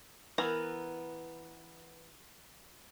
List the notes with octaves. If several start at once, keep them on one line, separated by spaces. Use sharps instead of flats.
E3 B3 A#4 A#5